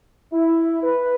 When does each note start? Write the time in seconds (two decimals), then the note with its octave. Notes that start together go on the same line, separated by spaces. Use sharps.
0.31 E4
0.82 B4